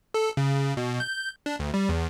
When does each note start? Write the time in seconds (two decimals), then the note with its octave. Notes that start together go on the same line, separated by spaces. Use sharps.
0.14 A4
0.37 C#3
0.77 B2
1.00 G6
1.46 D4
1.59 D2
1.74 G3
1.89 E2